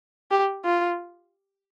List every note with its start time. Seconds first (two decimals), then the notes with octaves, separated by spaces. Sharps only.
0.31 G4
0.65 F4